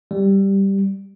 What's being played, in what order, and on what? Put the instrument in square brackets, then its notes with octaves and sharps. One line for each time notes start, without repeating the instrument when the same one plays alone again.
[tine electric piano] G3